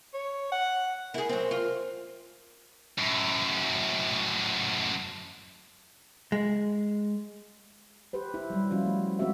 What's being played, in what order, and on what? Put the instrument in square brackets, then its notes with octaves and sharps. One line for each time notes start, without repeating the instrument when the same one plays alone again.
[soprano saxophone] C#5
F#5
[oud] E4 G#4 [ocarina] A#4
[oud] F#3 C4
F4
[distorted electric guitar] F#2 A2
[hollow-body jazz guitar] G#3
[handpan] G4 B4 C5
E4
F#3 G3
F3 C#4 F4 F#4
A3
G#3 C4 F4 F#4 E5